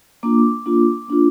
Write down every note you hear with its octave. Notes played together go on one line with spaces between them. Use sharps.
A#3 D4 F4 D6
A#3 D4 F4
A#3 D4 F4